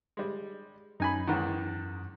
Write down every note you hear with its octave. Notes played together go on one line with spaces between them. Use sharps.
G3 G#3
F#2 D#4 G#5 B5
E2 G#2 D#3